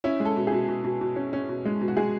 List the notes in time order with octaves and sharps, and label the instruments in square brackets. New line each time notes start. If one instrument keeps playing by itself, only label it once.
[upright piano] C#4 E4
G#3
A4
B2
G#4
B2
B2
B2
B2
C#4
C#4
B2
G#3
B2
F#4
G#3 G#4